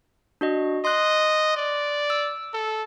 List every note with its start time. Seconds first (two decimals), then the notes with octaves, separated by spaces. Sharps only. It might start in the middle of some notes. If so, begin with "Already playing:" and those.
0.41 D4 F#4 D#5
0.85 D#5 C6 F#6
1.57 D5
2.10 E6
2.53 A4